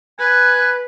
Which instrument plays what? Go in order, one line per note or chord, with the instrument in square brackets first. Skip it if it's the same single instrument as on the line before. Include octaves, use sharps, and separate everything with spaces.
[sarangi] B4 [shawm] G#5 [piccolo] F#6